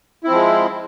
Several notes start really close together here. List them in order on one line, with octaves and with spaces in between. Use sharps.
E4 C4 F3 G#3